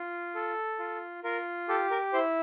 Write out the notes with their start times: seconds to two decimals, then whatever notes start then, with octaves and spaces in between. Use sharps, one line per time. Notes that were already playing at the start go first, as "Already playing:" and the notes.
Already playing: F4
0.35 A4
0.79 F4
1.24 F4 A#4
1.69 G4 A4
1.91 A#4
2.13 E4 C5